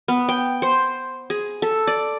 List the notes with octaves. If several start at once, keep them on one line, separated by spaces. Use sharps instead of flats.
B3
G5
C5
G#4
A4
D5